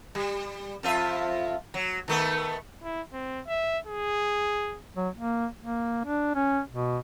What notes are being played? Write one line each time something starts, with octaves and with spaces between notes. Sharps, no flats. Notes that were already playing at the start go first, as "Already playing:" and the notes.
G3
F2 F4 E5
F#3
D#3 A3 B3
E4
C4
E5
G#4
F#3
A#3
A#3
D4
C#4
B2